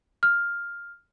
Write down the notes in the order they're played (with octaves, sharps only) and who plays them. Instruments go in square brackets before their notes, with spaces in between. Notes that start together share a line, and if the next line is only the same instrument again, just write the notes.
[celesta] F6